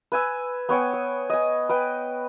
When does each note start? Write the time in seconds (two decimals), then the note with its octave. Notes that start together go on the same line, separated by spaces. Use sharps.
0.12 B4 G#5 E6
0.69 B3 C#5 G5 G#5
0.93 D#6
1.30 D#5 G#5
1.69 B4 G5